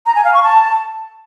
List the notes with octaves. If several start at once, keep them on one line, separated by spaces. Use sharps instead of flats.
A#5
G#5
F5
C#6
A5